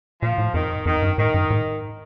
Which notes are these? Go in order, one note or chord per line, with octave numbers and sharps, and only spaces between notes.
A#2 F3
A2
F2 D#3
F2 D#3
G2
A2 D#3
G2
A2